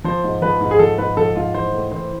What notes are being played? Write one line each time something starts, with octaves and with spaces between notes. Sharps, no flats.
F3 C5
G#2
F3 B4
G#2
G#4
F3 A4
G#2 B4
F3 A4
G#2 F4
E3 C5
A2
E3 C5